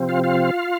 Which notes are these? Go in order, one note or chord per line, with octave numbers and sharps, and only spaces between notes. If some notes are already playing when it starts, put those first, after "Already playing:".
Already playing: C3 F3 C4
F4 F5
F4 F5